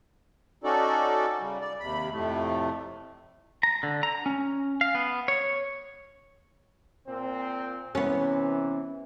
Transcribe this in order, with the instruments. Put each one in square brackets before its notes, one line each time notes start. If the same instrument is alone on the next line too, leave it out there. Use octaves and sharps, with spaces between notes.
[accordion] C#4 D#4 F#4 A4 D5
C#3 G3
D5
D#2 C3 B5
F2 A2 C3 A3
[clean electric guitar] A#5
D3
A#5
C#4
F5
B3
C#5
[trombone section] A#2 C4
[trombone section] C3 E3 [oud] B3 C#4